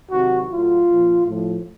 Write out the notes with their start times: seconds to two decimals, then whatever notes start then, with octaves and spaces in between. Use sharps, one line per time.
0.11 C3 D#3 F#3 F#4
0.50 A2 F#3 F4
0.88 A#2 F3
1.26 A2 F3